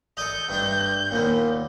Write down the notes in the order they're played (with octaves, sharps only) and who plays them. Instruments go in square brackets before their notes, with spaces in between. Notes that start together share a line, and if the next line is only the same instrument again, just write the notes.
[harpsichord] A4 D5 D#5 [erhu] G6
[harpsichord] G2 A3 D4
D#2 A#2 B3